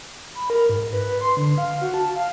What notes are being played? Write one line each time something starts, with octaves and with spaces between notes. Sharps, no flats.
B5
A#4
G#2
B4
C6
D3
F5
F#4
A5
F5